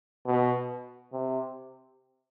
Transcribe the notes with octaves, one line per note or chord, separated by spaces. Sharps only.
B2
C3